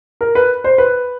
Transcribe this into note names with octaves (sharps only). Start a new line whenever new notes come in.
A#4
B4
C5
B4